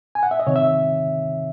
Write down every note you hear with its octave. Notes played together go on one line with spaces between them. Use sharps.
G#5
F#5
E5
D#5
C3 D#3 C#5
E5